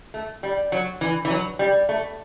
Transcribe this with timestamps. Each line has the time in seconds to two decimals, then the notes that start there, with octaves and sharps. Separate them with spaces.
0.14 A3
0.43 G3
0.72 F#3
1.01 E3
1.25 E3
1.30 F#3
1.59 G3
1.89 A3